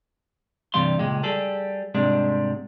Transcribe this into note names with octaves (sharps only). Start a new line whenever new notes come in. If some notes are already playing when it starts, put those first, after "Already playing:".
G2 C3 E3 G3 F5 C6
C#2 A#2 G#3 G4
G3 G#4 A4
G#2 C3 G3 G#3 D4